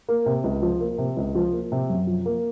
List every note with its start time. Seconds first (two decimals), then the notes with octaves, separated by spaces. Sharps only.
0.09 A#3
0.26 C3
0.44 C#2
0.62 F3
0.80 A#3
0.98 C3
1.17 C#2
1.35 F3
1.53 A#3
1.72 C3
1.90 F#2
2.07 F3
2.26 A#3